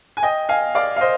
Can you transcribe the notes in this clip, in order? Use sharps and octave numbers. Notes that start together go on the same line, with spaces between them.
G#5
D#5 G5
F5 G#5
D5 F5
F5
C5 D#5